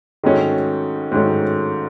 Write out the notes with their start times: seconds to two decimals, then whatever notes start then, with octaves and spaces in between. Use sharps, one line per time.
0.24 G#2 D#3 F#3 A3 C#4
1.12 G#2 D#3 F#3 A3 C#4